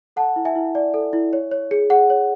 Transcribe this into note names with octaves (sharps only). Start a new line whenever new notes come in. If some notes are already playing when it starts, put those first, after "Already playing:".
A4 F#5 A5
E4
E5 G#5
E4
D5
A4
E4
C#5
C#5
G#4
G#4 F#5
C#5